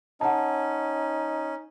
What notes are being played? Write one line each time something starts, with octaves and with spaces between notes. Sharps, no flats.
C#4 D#4 F#5 A5